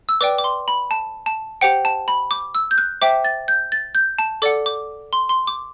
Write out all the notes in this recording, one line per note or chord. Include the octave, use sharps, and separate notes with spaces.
E6
B4 D5 G5 D6
D6
C6
B5
A5
A5
G4 C5 F#5 G5
A5
B5
D6
E6
G6
F#6
C5 E5 G5 D6
A6
G6
A6
G6
A5
A4 D5 F#5 D6
D6
C6
C6
D6